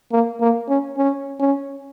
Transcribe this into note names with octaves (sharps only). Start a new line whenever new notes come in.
A#3
A#3
C#4
C#4
C#4